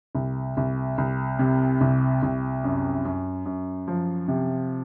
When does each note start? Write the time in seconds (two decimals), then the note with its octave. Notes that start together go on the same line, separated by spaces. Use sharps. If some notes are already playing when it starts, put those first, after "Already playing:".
0.15 C2
0.57 C2
0.98 C2
1.39 C3
1.81 C2
2.23 C2
2.64 F#2
3.05 F#2
3.46 F#2
3.88 F3
4.28 C3